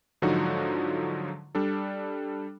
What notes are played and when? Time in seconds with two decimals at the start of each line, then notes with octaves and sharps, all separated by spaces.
0.22 G#2 D3 F3 F#3 D#4 F#4
1.55 G3 D4 A4